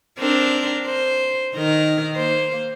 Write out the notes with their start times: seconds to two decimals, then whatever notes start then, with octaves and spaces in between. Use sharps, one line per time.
0.19 C4 D4 A#4
0.86 C5
1.55 D#3 A#4
2.15 A#3 C5